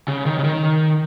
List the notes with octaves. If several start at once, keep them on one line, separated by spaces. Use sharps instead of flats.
C#3
D#3
C#3
D#3